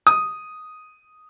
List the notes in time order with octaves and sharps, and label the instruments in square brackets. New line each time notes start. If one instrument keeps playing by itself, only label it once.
[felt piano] D#6